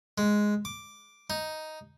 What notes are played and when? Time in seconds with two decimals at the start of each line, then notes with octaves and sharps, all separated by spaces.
0.18 G#3
0.65 D6
1.30 D#4